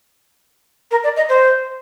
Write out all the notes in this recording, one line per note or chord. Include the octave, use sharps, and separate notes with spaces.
A#4
D5
D#5
C5